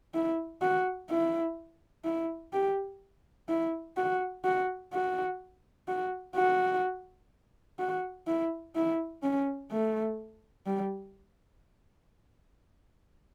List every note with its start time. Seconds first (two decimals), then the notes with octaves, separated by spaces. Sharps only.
0.14 E4
0.62 F#4
1.09 E4
2.05 E4
2.53 G4
3.49 E4
3.97 F#4
4.44 F#4
4.93 F#4
5.88 F#4
6.36 F#4
7.79 F#4
8.27 E4
8.75 E4
9.23 C#4
9.71 A3
10.66 G3